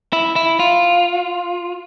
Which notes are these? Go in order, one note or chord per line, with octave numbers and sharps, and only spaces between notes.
E4
E4
F4